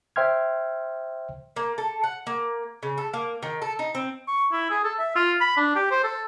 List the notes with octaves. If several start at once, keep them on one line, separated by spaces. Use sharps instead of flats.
C5 E5 G5 C6 F6 G#6
A#3
A4
F#5
A#3
C#3
A4
A#3
D#3
A4
D#4
C4
C#6
E4
G#4
A4
E5
F4
B5
D4
G4
C5
A4